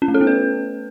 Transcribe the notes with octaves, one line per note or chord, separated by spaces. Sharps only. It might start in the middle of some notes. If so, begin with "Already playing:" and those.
C#4
A3
A4
B3
B4